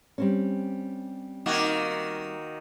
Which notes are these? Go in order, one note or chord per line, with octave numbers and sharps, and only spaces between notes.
G3 C4 C#4
D#3 A#3 F#4